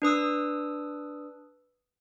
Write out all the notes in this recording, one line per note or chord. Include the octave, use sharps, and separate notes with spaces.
D4 B4 D#6 E6